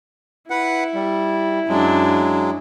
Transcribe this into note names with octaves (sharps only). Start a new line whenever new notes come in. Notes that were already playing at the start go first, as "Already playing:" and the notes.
E4 B4 F#5
G3
F#2 F#3 G#3 D4